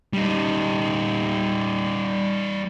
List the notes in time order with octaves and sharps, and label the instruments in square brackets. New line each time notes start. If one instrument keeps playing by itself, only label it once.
[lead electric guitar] G3 D#4